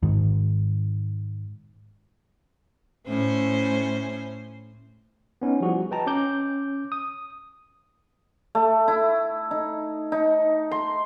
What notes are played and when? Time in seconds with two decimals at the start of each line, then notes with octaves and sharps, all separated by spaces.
0.03 G#2 D#3
3.08 A2 C#4 C5
5.42 B3 C#4 D#4
5.60 F3 G3 E4 F#4 G#4
5.91 B4 D#5 G5 A5 A#5
6.07 C#4 D6 G6
6.92 D#6
8.55 A3
8.88 E4
9.51 D#4
10.12 D#4
10.71 C6